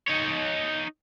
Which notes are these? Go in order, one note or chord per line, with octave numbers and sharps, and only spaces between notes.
D#4 C#5